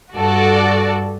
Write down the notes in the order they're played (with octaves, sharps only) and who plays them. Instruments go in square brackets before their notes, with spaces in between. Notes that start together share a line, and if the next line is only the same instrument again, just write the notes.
[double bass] G2 [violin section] F#4 A4 D5